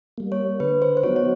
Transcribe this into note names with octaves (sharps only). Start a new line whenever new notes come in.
G3 A#3
C#5
D3 B4
C5
C5
F#3 B3 D#4 F#4 C#5
C#5